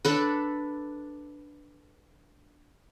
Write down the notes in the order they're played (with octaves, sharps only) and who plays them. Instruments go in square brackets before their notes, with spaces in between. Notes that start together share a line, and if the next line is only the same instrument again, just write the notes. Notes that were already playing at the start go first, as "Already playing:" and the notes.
[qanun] D4 A4 B4